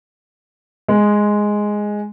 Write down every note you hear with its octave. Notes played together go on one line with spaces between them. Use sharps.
G#3